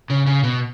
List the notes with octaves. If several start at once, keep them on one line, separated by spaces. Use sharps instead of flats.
C#3
C#3
B2